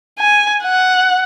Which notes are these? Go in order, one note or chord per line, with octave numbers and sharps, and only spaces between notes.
G#5
F#5